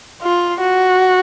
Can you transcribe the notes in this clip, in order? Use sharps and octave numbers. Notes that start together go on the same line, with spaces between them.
F4
F#4